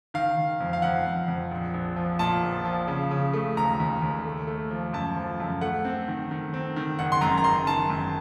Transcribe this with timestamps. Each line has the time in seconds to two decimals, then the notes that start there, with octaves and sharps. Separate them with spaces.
0.14 D#3 F5
0.37 D#3
0.60 F2
0.73 F5
0.82 F2 F#5
1.06 F2
1.28 F2
1.51 A#1
1.74 A#1
1.96 F3
2.19 A#2 A5
2.43 A#1
2.65 F3
2.88 C#3
3.11 C#3
3.33 A3
3.57 D#2 A#5
3.80 D#2
4.02 D#2
4.25 A3
4.47 A3
4.70 F3
4.93 F#2 A5
5.16 F3
5.40 F#2
5.61 A3 F#5
5.85 C4
6.08 D#3
6.31 D#3
6.54 C4
6.76 D#3
6.99 F#1 F#5
7.12 C6
7.21 F#2 A#5
7.38 A#5
7.44 F#1 C6
7.67 D#3 A5
7.90 F#2